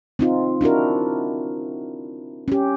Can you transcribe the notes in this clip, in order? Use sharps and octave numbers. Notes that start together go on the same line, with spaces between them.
C4 D#4 F4
D4 E4 F#4 A#4
C#4 G4